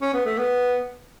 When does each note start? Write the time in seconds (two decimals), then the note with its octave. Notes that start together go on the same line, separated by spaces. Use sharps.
0.01 C#4
0.13 B3
0.26 A3
0.38 B3